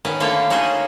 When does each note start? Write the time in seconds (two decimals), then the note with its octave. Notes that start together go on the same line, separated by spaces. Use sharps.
0.05 D#3 B3 C#4
0.20 D3 A3 A#3 D4 F4 C#5
0.50 C#4 D#4 F4 F#4 G#4 D#5